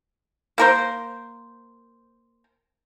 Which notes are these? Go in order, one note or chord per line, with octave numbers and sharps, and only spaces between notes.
A#3 A#4 C5